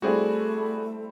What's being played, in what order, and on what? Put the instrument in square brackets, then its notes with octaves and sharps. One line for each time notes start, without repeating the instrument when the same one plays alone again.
[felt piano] G3 C4 E4 [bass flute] A3 [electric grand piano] F#4 G#4 D5